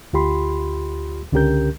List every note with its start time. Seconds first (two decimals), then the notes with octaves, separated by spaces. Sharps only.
0.13 D2 F4 G4 B5 C6
1.32 C#2 D3 C#4 G4 A#4 G6